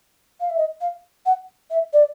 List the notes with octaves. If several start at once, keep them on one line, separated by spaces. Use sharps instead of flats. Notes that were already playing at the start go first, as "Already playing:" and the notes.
F5
E5
D#5
F5
F#5
E5
D5